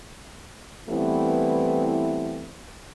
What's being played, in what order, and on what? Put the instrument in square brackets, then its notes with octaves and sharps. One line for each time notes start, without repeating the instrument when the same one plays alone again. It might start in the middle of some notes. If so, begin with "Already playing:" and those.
[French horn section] E3 G3 A3 B3 C4 E4